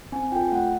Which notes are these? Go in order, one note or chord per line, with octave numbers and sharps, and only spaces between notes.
C4 G#5
F4 A4 G5
A3 F#5